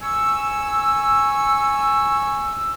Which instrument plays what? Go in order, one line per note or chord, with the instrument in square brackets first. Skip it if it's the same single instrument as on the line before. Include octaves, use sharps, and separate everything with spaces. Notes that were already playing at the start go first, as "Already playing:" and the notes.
[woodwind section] G#5 C#6 E6